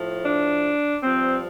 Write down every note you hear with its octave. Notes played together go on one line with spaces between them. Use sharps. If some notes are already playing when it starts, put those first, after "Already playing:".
Already playing: A2 F3
D4
G2 F3 C4